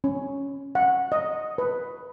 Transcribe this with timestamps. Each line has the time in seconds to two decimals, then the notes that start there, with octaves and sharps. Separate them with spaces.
0.04 C#4
0.75 F#5
1.12 D#5
1.58 B4